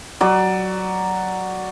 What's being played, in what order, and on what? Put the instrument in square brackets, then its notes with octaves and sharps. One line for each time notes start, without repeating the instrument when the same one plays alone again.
[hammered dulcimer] F#3 D5